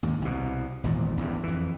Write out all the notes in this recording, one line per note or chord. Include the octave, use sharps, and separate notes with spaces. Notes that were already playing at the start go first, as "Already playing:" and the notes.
D#2 G#2
C2 B2
G#1 E2 A#2
A1 E2 G2
F2 E3